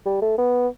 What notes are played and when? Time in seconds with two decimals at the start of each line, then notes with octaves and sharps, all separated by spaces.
0.05 G3
0.22 A3
0.38 B3